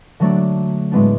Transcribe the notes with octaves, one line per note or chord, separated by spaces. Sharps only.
D3 F#3 A3 D4
A2 G#3 B3 D4